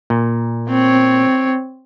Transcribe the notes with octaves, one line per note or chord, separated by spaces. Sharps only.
A#2
C4 C#5